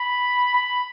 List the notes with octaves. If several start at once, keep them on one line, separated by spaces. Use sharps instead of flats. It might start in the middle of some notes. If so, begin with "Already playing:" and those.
Already playing: B5
B5